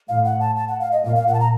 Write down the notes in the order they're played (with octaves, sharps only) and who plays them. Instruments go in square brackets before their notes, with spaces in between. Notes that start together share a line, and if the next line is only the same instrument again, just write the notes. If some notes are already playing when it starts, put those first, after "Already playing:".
[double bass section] A2 [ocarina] F5
[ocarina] F#5
A5
A5
F#5
F5
D#5
[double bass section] A#2 [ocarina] F5
[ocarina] F5
F#5
A5
A#5